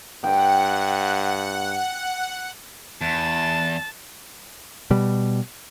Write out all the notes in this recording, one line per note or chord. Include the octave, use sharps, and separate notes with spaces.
G2 F#5 G5
E2 A5
B2 G3